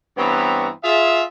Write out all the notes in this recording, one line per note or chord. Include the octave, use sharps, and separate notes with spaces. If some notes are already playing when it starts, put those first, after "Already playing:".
G2 E3 B3 C4 C#5 A#5
F4 G#4 E5